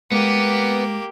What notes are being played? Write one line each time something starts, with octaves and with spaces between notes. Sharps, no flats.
G#3 A#3 B3 G4